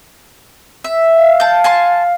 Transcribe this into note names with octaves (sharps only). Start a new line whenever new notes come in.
E5
F5
A5 G6
G#5 A5 C6